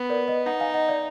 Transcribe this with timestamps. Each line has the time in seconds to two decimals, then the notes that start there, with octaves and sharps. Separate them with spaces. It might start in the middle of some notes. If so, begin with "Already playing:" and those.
Already playing: B3
0.09 A#4 D5
0.28 B4 D#5
0.46 D#4 D#5 F#5
0.60 F5 G#5
0.74 D#5 F#5
0.88 D5 F5